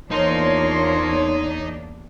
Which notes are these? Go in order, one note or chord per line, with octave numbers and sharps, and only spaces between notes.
E2 F3 A#3 D4 D#4 A#4 C#5 C6